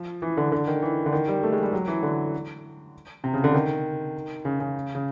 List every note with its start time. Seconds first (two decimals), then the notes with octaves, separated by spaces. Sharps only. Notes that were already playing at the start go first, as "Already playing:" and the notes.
Already playing: F3
0.22 E3
0.37 D3
0.52 D3
0.67 D#3
0.82 E3
1.06 D3
1.12 D#3
1.28 G3
1.43 A3
1.53 G#3
1.63 G3
1.73 F#3
1.88 E3
2.03 D3
3.24 C3
3.34 C#3
3.44 D3
3.54 D#3
4.45 C#3
4.60 C#3
4.95 C#3